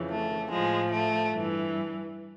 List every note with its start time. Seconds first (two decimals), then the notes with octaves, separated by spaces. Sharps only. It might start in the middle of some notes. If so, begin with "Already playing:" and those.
Already playing: F2 C#3 E3
0.11 A3
0.50 A2 F3 G#3
0.91 A3
1.31 G2 E3